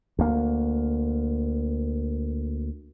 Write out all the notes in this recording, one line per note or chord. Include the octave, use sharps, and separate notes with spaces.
D2 A#3